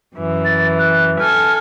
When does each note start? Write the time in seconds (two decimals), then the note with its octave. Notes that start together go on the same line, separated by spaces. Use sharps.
0.14 F#2 E3
0.45 A6
0.79 F#6
1.19 A4 G#5 F6